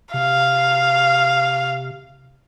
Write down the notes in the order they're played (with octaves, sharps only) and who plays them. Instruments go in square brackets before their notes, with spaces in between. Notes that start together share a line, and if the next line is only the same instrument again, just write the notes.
[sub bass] C3 [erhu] F5